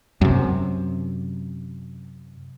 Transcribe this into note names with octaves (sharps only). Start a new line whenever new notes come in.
F#2 C3